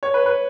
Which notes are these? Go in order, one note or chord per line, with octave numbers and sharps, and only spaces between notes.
C#5
B4
B4